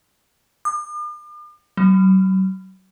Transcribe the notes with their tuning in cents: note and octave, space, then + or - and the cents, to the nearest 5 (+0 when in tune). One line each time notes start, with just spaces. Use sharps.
D6 +45
F#3 +40